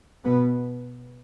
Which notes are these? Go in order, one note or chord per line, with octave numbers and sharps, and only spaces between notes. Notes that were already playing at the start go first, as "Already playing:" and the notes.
B2 B3